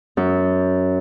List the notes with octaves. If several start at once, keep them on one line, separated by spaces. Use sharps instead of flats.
F#2